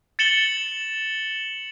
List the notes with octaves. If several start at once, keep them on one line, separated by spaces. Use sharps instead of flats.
A6 C#7 E7 F#7 G7